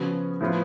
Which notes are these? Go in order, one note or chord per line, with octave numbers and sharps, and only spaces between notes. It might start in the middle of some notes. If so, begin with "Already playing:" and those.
Already playing: C#3 F3 B3 F#4
A2 F3 B3 F4